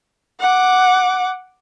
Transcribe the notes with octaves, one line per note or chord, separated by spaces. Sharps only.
F#5 D6